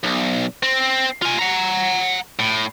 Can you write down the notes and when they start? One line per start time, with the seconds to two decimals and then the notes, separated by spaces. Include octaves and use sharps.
0.03 B1
0.63 C4
1.22 F4 G#5
1.39 F#5 A#5
2.39 A2